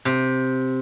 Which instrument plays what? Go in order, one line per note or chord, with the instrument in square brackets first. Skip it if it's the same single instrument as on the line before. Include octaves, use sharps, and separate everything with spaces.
[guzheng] C3